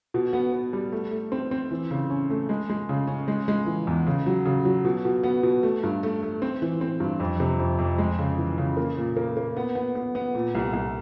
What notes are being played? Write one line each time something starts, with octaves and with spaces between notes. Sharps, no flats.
B2
B3
B3
G3
A3
A3
C4
C4
E3
C#3
C#4
A3
G#3
G#3
C#3
C#4
G#3
G#3
E3
E2
C#3
F#3
C#3
F#3
B2
B2
B3
B2
A3
G2
A3
A3
C4
E3
C4
G2
F2
C3
F2
F2
G#3
C#3
E3
C#3
A#3
A#2
A#3
A#3
B3
B3
B3
B3
A#2
C2
C2